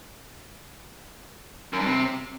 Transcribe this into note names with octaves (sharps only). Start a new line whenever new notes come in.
F#2
G2
C3